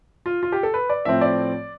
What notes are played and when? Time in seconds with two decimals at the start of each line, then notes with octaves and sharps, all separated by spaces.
0.26 F4
0.43 F4
0.52 G4
0.63 A4
0.74 B4
0.90 D5
1.05 A2 F3 C4 E5
1.21 D5